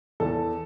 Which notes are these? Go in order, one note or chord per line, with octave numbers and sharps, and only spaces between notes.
E2 A4